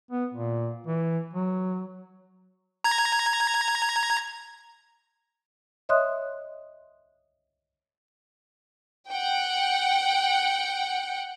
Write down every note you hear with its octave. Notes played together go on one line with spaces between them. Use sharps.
B3
A#2
E3
F#3
A#5 G#6
C#5 D#5 E5 C6 D#6 F#6
F#5 G5